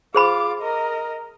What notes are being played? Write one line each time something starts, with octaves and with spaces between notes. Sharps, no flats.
F4 G#4 C5 B5 D6
A#4 D#5